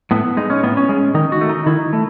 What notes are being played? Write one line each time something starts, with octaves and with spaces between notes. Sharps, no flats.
A2 B3
G#3 D#4
C#4
A2 B3
C#4
G#3
D#3 D#4
F#4
A3
D#4
D#3 E4
A3